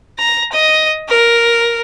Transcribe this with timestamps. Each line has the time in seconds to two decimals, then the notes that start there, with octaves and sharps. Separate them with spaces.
0.18 A#5
0.52 D#5
1.08 A#4